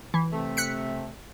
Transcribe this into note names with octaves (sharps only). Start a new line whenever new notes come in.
E3
C3 A3
F#6 B6 C#7